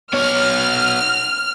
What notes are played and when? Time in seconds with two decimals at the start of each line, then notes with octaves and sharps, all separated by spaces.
0.13 B3 C#5 F6